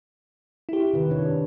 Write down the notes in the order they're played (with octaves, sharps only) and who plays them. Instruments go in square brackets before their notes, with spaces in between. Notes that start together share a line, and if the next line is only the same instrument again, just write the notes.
[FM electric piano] E4 G4
[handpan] C3 D#3 B4
D4 C#5